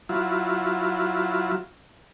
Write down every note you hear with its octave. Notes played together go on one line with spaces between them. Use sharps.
F#3 E4 F4